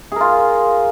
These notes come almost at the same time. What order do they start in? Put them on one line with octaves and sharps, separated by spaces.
G#4 A#4 F4